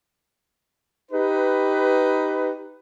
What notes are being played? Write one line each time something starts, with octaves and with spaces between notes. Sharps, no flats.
D#4 G4 B4